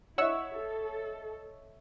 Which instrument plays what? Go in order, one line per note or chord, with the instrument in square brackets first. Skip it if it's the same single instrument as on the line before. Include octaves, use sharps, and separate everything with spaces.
[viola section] E4 [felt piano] C#5 D#5 E5 [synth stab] F#5 C#6 E6
[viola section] A4